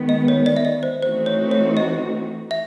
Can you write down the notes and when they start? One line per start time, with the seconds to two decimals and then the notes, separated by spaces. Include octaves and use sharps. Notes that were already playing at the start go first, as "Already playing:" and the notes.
Already playing: D#3 G#3 B3
0.09 D#5
0.28 C#5
0.46 D5
0.57 E5
0.65 D#5
0.83 C5
1.02 E3 A3 C4 D#4 F#4 C5
1.26 C#5
1.51 C#5
1.77 D#5
2.51 E5